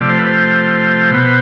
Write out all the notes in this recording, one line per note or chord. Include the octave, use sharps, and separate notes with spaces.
C3 F3 A3 D5
C5
B4
C5
B2 B3